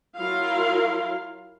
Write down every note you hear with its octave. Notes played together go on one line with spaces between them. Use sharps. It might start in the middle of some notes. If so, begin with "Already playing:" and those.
F#3 E4 F4 A#4 F5 C6